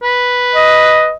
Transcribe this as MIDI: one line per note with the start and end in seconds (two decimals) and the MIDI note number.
0.02 1.12 71
0.55 1.15 75